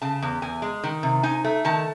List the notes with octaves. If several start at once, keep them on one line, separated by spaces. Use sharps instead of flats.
C#3 A5
E2
E2 G#5
G#3
D#3
C3
D#4 G#5
A3
D#3 A5